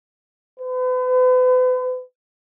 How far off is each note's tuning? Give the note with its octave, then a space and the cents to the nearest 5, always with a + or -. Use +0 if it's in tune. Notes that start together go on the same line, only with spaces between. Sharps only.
B4 +40